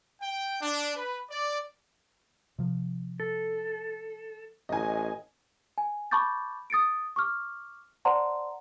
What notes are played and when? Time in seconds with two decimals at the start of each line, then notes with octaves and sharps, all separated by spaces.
0.21 G5
0.61 D4
0.95 B4
1.29 D5
2.58 C3 F3
3.20 A4
4.69 A1 D#5 G#5
5.78 G#5
6.11 A5 B5 C#6 D6 G6 A6
6.70 D#6 A6 C#7 D7
7.16 C#6 D6 F6
8.05 C5 D5 F#5 A5 A#5 C6